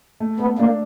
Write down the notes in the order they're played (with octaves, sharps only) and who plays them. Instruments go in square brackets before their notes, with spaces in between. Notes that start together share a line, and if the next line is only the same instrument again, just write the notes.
[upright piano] A3
[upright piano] A3 [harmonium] B3
[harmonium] A#3 [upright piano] D4